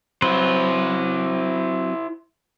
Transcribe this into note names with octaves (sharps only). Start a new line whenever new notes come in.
F#3 C4 E4 B4 C5